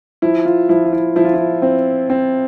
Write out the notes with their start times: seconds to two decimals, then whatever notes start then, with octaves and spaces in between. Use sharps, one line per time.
0.22 F3 E4
0.45 F4
0.69 F3 E4
0.85 F4
0.93 E4
1.16 F3 E4
1.25 F4
1.34 E4
1.62 C4
2.10 C4